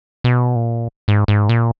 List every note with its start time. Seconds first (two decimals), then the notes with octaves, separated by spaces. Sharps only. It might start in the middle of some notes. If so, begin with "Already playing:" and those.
0.24 B2
0.56 A#2
1.08 G#2
1.28 G#2
1.49 A#2